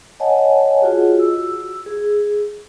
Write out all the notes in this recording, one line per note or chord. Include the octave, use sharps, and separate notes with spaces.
C#5 D#5 F#5 G#5 A5
F4 F#4 G#4
E6
G#4